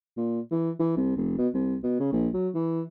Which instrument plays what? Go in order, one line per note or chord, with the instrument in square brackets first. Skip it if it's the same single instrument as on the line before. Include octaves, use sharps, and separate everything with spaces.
[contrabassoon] A#2
E3
E3
C2
F1
B2
C2
B2
C#3
A#1
F#3
E3